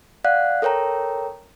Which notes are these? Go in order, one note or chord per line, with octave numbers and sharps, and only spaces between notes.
D5 F5 F#5 F#6
A4 A#4 C#5 G5 A#5